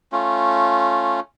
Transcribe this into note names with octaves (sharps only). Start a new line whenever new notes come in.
A3 C#4 F4